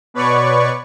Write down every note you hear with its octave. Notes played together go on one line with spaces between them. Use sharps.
B2 B4 C#5 D5 C#6